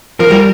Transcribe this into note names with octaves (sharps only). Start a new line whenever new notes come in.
F3 A#4
G3